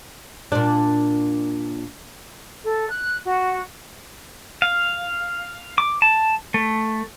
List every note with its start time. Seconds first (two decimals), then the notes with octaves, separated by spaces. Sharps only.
0.52 A#2 D4
2.65 A4
2.90 F#6
3.25 F#4
4.62 F5
5.78 D6
6.02 A5
6.54 A3